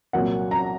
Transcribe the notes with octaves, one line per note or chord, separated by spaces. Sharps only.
C2 A#2 F#3 A#3 F#5
A#5